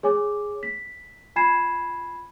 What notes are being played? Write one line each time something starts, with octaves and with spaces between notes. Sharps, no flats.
G#4 C#5 G#5 D6
B6
F4 G#5 B5 G#6 C7 E7